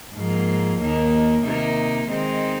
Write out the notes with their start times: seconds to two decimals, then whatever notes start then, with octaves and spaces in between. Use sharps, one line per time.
0.15 G#2 F3 A#3
0.79 D#2 D#3 A#3
1.44 C3 D#3 A#3 D#4
2.08 D#3 G#3 C4 D#4